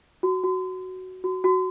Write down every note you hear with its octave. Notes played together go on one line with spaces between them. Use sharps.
F#4
F#4
F#4
F#4